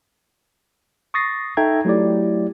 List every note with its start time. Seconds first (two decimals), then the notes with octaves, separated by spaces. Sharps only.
1.14 C#6 D#6 A6 A#6 C7
1.57 D#4 A4 E5 G5 A#5 G#6
1.85 F#3 A3 E4 G4 D5